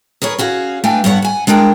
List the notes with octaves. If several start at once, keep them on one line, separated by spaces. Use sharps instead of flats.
G#4 A#4 B4 C#5
C#4 F#4 G#4 F5
A3 D4 B4 F5 G5 G#5
G2 B3 C#5 F#5
F#5 G#5
G#3 D4 G#4 A#4 G5